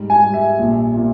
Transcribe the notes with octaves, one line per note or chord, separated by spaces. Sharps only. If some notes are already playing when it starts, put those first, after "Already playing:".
Already playing: G#2 G3
G#5
G3
E5
A#1
A#2